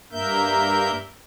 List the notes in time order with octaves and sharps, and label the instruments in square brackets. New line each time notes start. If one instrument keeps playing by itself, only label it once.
[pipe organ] G2 A#3 A#4 E5 G6